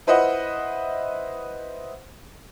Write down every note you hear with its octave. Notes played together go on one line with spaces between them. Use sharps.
E4 B4 C5 D#5 F#5